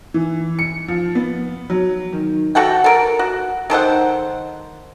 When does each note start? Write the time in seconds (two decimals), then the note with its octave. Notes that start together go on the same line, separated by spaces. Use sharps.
0.14 E3
0.59 C#7
0.88 F3
1.15 B3
1.70 F#3
2.13 D#3
2.55 F#4 A4 F#5 G5
2.84 A4 A#4
3.19 F#4
3.70 D#3 A4 C5 F#5